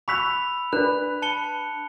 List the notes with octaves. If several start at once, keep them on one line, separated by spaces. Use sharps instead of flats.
B5 C#6 E6 F#6 B6 F7
D4 B4 D5 F#6
A5 C#7 G7